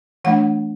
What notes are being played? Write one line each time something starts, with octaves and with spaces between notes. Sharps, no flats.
E3 A3 D4 F#5